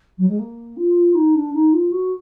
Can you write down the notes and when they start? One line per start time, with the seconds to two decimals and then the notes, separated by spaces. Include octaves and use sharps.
0.18 F#3
0.28 G#3
0.38 A#3
0.76 F4
1.14 D#4
1.34 D4
1.53 D#4
1.73 F4
1.91 F#4